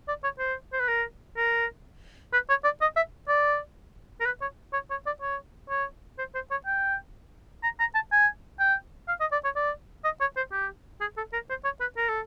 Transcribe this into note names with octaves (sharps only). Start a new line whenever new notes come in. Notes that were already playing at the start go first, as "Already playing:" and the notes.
D5
C#5
C5
C5
B4
A#4
A#4
B4
C#5
D5
D#5
E5
D5
A#4
B4
C#5
C#5
C#5
D5
C#5
C#5
C5
C5
C#5
G5
A#5
A#5
A5
G#5
G5
F5
D#5
D5
C#5
D5
D#5
C#5
C5
G4
G#4
A4
A#4
C5
C#5
B4
A#4
A4